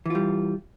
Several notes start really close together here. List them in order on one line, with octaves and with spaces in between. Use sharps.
E3 F4 G3